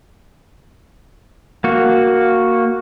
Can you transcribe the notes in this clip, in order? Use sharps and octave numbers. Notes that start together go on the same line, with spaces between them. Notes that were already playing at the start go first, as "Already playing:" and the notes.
A#3 F#4